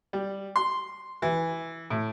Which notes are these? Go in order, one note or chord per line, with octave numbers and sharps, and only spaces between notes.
G3
C6
E3
A2